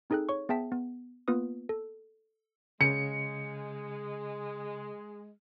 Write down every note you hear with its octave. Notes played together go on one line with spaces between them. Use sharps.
C4 D#4 G#4 A4 G5 F#6
C#5 C#6
B3 G#4 E5 G5 A5 B6
B3
A#3 B3 F4 B4 D#6
A4
C#3 G#3 C#7